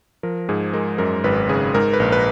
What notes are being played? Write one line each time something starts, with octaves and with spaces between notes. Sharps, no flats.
F3 A#4
G#2 G#4
G#3 A#4
F#2 A#4
G#1 B4
C#3 G#4
G#2 A#4
B4
A#1
B4